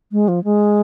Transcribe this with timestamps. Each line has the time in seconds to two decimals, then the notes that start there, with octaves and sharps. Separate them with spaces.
0.12 G#3
0.28 F3
0.44 G#3